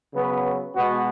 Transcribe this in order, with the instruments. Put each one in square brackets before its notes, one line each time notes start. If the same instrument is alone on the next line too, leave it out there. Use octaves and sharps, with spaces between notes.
[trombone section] C#3 F#3 B3 B4
B2 G#3 B3 F#4